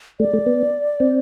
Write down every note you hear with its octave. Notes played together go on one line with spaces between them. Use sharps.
A3 D5
A3
B3
C4